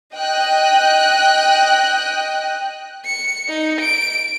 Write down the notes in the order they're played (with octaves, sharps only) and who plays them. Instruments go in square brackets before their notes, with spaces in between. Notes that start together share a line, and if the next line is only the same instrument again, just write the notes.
[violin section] D#5 G5 F#6
[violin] C#7
D#4
D7